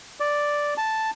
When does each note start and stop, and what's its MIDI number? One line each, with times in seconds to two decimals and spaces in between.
0.20 0.74 74
0.77 1.10 81